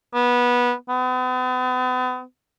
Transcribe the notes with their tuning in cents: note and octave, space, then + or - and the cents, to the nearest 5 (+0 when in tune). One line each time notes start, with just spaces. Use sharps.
B3 -15
B3 +40